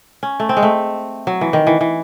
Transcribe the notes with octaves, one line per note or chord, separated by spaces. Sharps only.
C#4
A3
C4
G#3
A3
F#3
E3
D#3
E3
E3